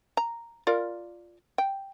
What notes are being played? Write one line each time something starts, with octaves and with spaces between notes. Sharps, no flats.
A#5
F4 A#4 D5
G5